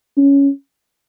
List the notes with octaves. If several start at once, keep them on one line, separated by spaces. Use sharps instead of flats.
C#4